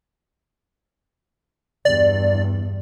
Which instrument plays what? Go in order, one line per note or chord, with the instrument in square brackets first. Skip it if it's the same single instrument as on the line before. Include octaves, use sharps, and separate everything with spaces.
[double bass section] E2 G2 [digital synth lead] D5